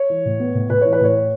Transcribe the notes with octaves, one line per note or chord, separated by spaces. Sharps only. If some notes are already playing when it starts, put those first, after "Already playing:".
Already playing: C#5
E3
A2
B3
A2
A2 B4
E3 C#5
B4
A2 C#5